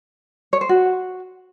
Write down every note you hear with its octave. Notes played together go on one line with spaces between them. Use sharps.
C#5
C5
F#4